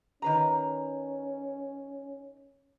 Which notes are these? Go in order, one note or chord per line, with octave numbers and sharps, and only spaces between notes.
D#3 C#4 B4 A#5